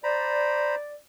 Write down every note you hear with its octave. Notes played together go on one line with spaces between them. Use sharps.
C5 D5 A#5 B5